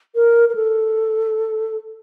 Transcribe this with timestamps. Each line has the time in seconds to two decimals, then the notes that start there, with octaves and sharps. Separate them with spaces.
0.15 A#4
0.49 A#4
0.55 A4